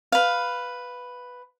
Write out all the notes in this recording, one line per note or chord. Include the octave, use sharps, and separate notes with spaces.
B4 F5